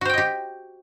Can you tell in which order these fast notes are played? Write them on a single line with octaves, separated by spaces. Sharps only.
F#4 C5 G5 D#5 G4